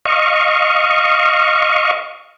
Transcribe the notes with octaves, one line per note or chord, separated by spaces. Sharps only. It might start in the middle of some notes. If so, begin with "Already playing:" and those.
D#5 F5 C#6